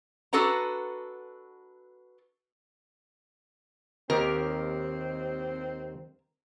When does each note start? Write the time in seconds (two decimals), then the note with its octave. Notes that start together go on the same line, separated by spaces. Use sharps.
0.33 D4 F#4 A4 B4 F#5 A#5
4.10 D#2 D#3 C4 G4 A#4